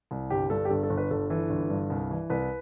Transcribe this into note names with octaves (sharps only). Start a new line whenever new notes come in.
C2
G1 G4
G2 A4
G4
G1 A4
A4
G1
B4
G1 A4
E3 A4
G1
G2
C2
E3
C2 B4